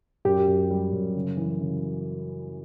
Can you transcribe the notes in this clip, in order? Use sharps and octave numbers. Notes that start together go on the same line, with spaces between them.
F#2 G4
F#2
G3
F#2
C#3
E3
C#3